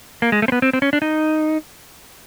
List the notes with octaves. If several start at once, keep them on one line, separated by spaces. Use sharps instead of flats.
A#3
G#3
A3
C4
B3
C4
C4
C#4
D4
D#4